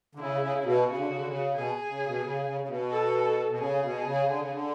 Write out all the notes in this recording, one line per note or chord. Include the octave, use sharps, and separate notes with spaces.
D3
C#3 E4
C#3
C#3
B2
C#3 F#4
D3
C#3
D3
C#3
B2 G#4
C#3
B2
C#3
C#3
C#3
B2
A4
B2
C#3 G#4
B2
C#3
D3
C#3
D3